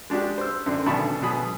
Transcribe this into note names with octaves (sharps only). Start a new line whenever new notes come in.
G#3 D4 F#4 G4
C5 E6
F#2 D3 C4
G#1 B2 D3 A5 B5 C#6
B2 F#3 G#4 B5 D#6